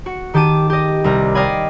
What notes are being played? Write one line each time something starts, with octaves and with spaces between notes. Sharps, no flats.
F#4 C#7
D#3 G4 A5 D6 D#7
G4 D#5
C2 G3 A#4
D5 D#5 F5 G5 G#5 B5